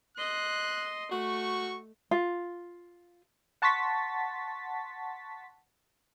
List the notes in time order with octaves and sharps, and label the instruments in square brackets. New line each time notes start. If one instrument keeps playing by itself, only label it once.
[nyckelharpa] D#5 C6 [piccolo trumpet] F#6
[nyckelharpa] A3 [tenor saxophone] F#4 [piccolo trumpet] C#6
[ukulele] F4
[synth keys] F#5 A5 C6 C#6 A6 B6